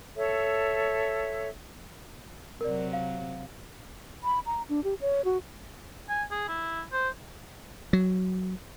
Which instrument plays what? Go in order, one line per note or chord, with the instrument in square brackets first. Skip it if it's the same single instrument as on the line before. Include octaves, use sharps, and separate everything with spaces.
[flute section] A4 C#5 E5
[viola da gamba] C3 F#3 [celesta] A#4 D5
[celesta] F5
[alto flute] B5
A#5
D4
G4
C#5
F#4
[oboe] G#5
G#4
E4
C5
[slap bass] F#3